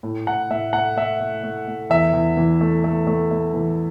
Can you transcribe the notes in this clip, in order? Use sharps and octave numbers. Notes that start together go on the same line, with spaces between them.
A2
A2 F#5
A2 E5
A3 F#5
A3 E5
A3
A3
A3
E2 E5
E2
E3
A3
A3
A3
A3
E3